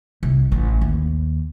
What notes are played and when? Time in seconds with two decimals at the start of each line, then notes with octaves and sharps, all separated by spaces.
0.23 C2
0.52 A1
0.81 D#2